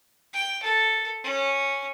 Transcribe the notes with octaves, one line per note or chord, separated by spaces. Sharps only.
G5
A4
C#4